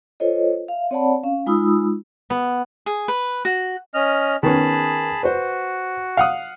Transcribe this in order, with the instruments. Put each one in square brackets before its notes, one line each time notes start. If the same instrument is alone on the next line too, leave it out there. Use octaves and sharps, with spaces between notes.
[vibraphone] F4 A4 C5 C#5 D#5
E5 F5
C4 C#5 D5 F#5 A5 B5
C#4 F5
G#3 D#4 F4 B5 D#6 E6
[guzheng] B3
[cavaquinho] G#4
B4
F#4
[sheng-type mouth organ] C#4 D#5 F6
[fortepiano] D#3 B3 C#4 [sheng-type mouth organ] G#4 A5 B5
[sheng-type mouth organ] F#4 [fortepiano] B4 C5
[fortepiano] F5 F#5 D#6